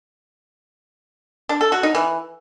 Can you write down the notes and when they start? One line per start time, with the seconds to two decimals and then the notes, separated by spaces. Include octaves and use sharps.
1.49 D4
1.61 A4
1.72 F#4
1.83 D#4
1.95 E3